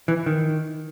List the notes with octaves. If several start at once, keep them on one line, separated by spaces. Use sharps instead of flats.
E3
D#3